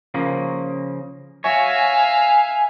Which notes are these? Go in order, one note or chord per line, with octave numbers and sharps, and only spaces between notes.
C#3 F3 A#3
F#4 C#5 E5 F5 G#5